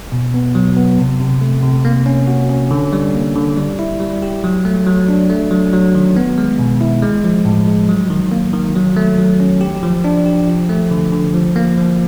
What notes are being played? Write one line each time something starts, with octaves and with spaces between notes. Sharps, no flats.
B2
B3
F#3
B3
C3
C3
A3
C3
A#3
C#4
F#4
C#4
D3
G3
A#3
D3
G3
E4
G3
G4
F#3
A3
F#3
D4
A3
F#3
F#3
D#3
B3
G#3
B2
E4
G#3
F3
A2
G#3
F#3
D#3
A#3
D#3
F#3
A3
F#3
C#4
G4
F3
D4
G4
F3
A3
D3
D3
F3
A#3
F3